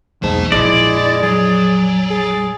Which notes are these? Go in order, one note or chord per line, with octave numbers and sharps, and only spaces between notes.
B1 E2 G#2 A#3 A5
A#1 F2 G#3 E4 D5
F#3 G#4
G#4